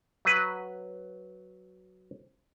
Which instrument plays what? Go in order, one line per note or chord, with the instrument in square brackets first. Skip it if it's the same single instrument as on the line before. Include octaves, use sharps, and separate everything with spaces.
[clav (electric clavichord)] F#3 B4